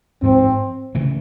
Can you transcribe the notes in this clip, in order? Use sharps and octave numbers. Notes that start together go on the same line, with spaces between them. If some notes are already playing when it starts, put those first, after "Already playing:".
A1 G#2 F3 G#3 C4
C#3 E3 A3